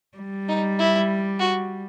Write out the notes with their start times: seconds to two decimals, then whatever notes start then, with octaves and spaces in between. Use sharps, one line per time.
0.17 G3
0.49 D#4
0.79 E4
1.40 F#4